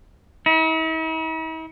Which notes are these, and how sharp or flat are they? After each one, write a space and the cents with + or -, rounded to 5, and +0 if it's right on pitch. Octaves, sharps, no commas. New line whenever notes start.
E4 -45